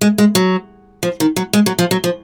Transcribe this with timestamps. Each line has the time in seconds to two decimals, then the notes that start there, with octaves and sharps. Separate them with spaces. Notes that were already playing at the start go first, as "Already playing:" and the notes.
0.01 G#3
0.18 G#3
0.35 F#3
1.03 F3
1.20 D#3
1.36 F#3
1.53 G#3
1.66 F#3
1.79 F3
1.91 F#3
2.04 F3